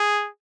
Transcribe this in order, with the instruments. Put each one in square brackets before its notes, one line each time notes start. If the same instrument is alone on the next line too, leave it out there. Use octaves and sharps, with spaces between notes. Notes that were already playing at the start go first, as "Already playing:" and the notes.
Already playing: [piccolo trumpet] G#4